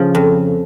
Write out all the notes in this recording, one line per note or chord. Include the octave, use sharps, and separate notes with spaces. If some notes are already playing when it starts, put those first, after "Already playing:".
Already playing: C#3 F3
F2